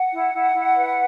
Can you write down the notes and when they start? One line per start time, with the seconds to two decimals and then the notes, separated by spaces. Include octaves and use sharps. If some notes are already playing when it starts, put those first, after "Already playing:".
Already playing: F#5
0.13 E4
0.33 E4
0.54 E4
0.74 B4